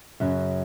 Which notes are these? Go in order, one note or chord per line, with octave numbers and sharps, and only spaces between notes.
F#2 C#3 F#3